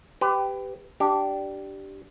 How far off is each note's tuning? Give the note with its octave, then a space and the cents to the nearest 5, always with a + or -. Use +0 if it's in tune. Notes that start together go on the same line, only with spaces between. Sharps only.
G4 +0 B4 +30
D4 +0 G4 -15